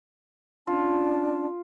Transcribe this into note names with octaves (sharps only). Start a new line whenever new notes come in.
C#4 D4 F4 A5